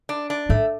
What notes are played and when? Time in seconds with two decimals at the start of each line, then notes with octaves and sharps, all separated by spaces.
0.09 D4
0.30 D4
0.49 G#2 A3